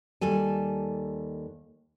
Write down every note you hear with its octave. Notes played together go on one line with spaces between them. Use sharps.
D#2 G3 A4 G#5